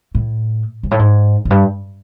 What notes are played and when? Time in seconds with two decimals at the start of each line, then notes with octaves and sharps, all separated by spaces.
0.15 A2
0.83 G#2
0.91 A2
0.99 G#2
1.45 F#2
1.50 G2